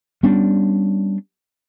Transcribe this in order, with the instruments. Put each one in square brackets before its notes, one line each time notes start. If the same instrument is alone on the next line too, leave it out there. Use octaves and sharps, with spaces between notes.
[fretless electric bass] G3 B3 C#4 D4